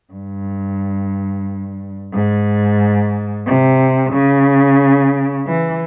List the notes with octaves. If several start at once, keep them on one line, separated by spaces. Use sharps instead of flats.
G2
G#2
C3
C#3
E3